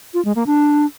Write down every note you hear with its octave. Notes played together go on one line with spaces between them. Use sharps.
F4
G#3
A#3
D4